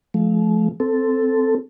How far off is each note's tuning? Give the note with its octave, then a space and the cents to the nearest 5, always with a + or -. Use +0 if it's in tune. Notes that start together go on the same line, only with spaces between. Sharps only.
F3 -5 A3 -40
C4 -10 A4 +0